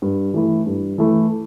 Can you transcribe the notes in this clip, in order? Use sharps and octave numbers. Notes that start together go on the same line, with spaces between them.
G2
E3 A3 E4
G2
E3 A3 E4